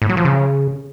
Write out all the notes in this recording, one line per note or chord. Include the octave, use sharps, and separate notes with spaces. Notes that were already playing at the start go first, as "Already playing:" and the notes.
A2
F#3
F3
C#3